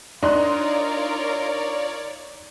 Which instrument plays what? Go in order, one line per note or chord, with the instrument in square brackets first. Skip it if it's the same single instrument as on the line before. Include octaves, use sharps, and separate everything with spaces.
[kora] D4 [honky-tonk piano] D#4 C6 F#6 [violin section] F4 A#4 [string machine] C#5 D5